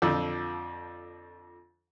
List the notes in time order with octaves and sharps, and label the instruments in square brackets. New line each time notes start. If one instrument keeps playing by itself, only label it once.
[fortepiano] F2 D3 F3 E6